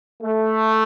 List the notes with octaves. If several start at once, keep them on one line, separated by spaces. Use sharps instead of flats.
A3